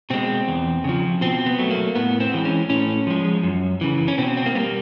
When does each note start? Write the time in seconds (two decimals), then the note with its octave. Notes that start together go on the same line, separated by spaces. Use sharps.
0.10 B2 G#3 C4
0.48 E2
0.84 C#3 F3
1.21 B2 C4
1.46 B3
1.58 F#3 A3
1.71 A#3
1.95 A2 B3
2.20 C4
2.33 E3 G#3
2.45 C#4
2.70 A2 C#4
3.07 F3 G#3
3.44 F#2
3.81 C#3 E3
4.08 C#4
4.18 B2 C4
4.37 C4
4.46 A#3
4.55 G3 B3
4.60 A#3